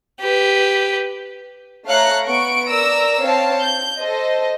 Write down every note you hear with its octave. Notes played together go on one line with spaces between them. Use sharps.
G4 B4
A3 C#5 F5 A#5 F#6 C#7
B3 C#6 D7
A#4 D5 A#5 E6
C4 C#5 F5 A5
G6
A4 C5 D#5